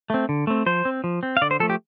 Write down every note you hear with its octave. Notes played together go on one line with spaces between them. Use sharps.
A3 C4
D3
A3 C4
F3 C5
C4
F3
C4
F5
D3 D5
C5
F3 A3 A4
G4